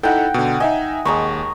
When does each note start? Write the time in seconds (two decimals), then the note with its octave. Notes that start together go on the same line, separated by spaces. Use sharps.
0.03 D#4 E4 A4 F#5 G5
0.34 B2 D3
0.60 D#4 D#5 E5 G#5
1.05 D#2 G#3 A#5 C#6